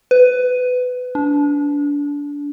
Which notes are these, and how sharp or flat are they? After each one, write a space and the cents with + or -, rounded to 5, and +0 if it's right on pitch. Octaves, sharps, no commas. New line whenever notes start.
B4 +20
D4 -25